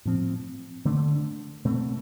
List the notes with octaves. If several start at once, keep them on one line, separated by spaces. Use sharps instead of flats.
A2 F3 C4
D3 A3 D4
B2 A3 C4